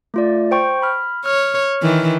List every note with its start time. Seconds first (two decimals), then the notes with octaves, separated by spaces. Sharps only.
0.14 A3 F4 D5
0.51 C5 G5 C#6
0.82 B5 F6
1.26 C#5 F6
1.82 D#3 E3